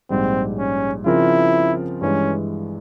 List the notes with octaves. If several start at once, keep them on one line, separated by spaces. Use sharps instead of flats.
A#1 G#2 G3 C4
C#4
C#3 F3 C4 E4 F4 A#4
G2 E3 G#3 C#4